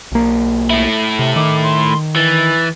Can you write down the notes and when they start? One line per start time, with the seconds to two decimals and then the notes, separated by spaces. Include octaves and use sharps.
0.12 B1 A#3
0.70 A3 E4
1.19 C3
1.36 D#3 D6
1.63 C6
2.16 E3 A6